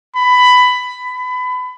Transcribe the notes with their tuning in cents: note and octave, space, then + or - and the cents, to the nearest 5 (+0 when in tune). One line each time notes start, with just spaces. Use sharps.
B5 +15
B5 +25